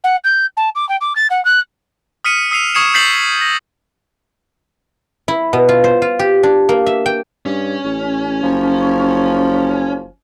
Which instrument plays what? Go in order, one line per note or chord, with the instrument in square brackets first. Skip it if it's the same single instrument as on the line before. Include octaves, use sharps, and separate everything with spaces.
[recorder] F#5
G6
A5
D6
G5
D6
A6
F#5
F#6
[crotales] D#6 F6 B6 C#7 D#7
D#6 E6 C7 D#7 F7
C#6 D#6 G#6 C7 C#7 E7
G6 A6 B6 C7 F7 F#7
A#6
[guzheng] E4
B2
F4
C5
F4
G4
D4
A#3
E5
G5
[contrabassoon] G2 [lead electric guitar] C#4
[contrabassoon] A1
[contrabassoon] F#1 [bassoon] F3